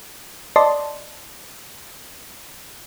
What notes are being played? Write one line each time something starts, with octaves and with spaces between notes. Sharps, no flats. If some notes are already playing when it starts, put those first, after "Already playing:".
D5 D#5 A5 C6